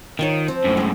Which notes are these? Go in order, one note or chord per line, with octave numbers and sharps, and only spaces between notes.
D#3 D#4 F4 C#5
F3 C4
F#2 A2
C3 G#3